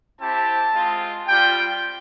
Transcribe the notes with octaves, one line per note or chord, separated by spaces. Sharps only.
C4 E4 G4 A5
G#3 C4 F4
G3 C4 F4 G5